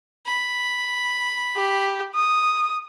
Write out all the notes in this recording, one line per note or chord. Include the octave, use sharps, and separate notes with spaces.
B5
G4
D#6